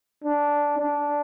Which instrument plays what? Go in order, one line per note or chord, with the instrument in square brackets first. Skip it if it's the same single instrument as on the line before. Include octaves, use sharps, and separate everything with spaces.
[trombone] D4
D4